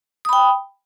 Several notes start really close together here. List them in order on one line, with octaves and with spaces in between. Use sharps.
D#6 B5 G5